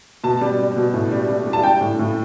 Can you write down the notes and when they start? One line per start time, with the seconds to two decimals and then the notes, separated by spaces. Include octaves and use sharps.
0.24 B2 A5
0.41 G3
0.59 G3
0.76 B2
0.94 A2
1.11 G3
1.28 G3
1.46 G3
1.53 A5
1.63 G3 G5
1.81 A2
1.99 A2